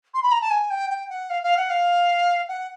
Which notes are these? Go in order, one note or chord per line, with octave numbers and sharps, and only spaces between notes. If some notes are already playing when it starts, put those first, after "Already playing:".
C6
B5
A#5
A5
G#5
G5
G5
F#5
F5
F5
F#5
F5
F#5